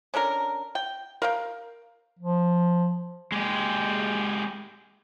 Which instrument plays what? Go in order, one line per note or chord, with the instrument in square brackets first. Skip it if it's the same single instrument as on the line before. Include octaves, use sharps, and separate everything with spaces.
[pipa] C#4 D4 A4 A#4
G5
A#4 F5 G5
[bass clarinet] F3
[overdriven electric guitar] G#3 G4